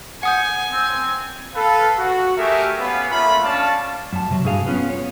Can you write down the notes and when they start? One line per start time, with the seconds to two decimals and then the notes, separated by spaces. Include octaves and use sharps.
0.23 F#5 G#5 D#6 G6
0.72 C4
1.55 A4 B4 F5
1.99 F#4
2.38 A3 G4 G#4 A#4 E5
2.79 B3 C#4 B4 F5
3.10 A3 A#3 C#4 F4 E5 B5
3.43 C#4 D4 D5 F5 A5
4.13 F#2 A5
4.30 C3 F#3
4.45 G2 F#4 G#4 F5
4.66 B3 C#4 F4 B4
4.90 C#5